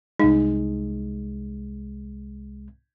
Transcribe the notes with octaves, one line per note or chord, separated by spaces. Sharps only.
C2 G#3 D#4